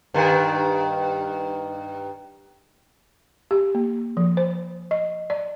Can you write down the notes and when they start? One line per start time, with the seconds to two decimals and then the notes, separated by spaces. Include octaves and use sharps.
0.14 G2 D#3
3.51 G4
3.75 A#3
4.17 F3
4.37 C5
4.91 D#5
5.30 D5